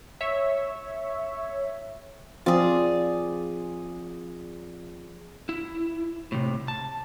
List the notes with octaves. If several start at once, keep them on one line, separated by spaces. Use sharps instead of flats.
C#5 E5
F3 C4 F4 G#4 D5
E4
A2 C3
A5